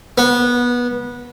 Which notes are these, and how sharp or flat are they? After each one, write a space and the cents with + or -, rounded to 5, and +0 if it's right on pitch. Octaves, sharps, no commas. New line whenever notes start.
B3 -20